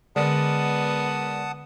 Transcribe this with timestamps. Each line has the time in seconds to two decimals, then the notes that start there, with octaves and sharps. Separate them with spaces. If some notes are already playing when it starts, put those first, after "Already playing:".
0.16 D3 G#3 B3 A#4 D5 F#5 A5 D#6